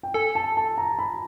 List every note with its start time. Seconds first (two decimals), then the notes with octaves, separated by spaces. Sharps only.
0.03 G5
0.14 A4 G#5
0.35 A5
0.57 A5
0.78 A#5
0.99 B5